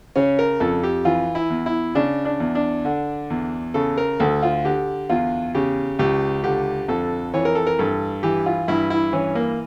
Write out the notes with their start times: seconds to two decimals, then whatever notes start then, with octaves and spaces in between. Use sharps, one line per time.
0.16 C#3 C#4
0.39 A#4
0.60 F2 A4
0.83 G4
1.05 E3 F4
1.35 E4
1.50 E2
1.66 E4
1.95 C#3 D4
2.25 D4
2.40 E2
2.55 D4
2.85 D3
3.30 E2
3.74 C#3 A4
3.98 A#4
4.20 D2 A4
4.43 F4
4.65 D3 G4
5.10 E2 F4
5.55 C#3 G4
5.99 C#2 G4
6.44 D3 G4
6.88 F2 A4
7.34 E3 C#5
7.45 A#4
7.55 A4
7.67 A#4
7.79 G2 A4
8.23 E3 G4
8.46 F4
8.68 G2 E4
8.90 E4
9.13 E3 C#4
9.35 A#3